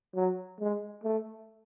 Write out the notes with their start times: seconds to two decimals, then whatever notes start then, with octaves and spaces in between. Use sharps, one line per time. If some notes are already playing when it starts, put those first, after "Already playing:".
0.15 F#3
0.60 G#3
1.04 A3